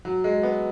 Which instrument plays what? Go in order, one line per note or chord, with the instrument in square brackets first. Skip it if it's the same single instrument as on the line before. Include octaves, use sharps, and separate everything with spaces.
[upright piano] F#3
G#3
B3